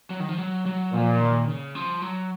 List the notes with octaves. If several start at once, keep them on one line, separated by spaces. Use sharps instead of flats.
F#3
D#3
F3
F#3
F#3
A#2 F3
D#3
C#3
F3
F#3